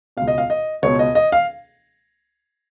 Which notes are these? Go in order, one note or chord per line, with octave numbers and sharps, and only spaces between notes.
C#2 B2 F5
D#5
F5
D#5
C#2 B2 C#5
D#5
D#5
F5